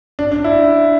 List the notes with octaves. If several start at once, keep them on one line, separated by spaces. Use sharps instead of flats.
D4
D4
E4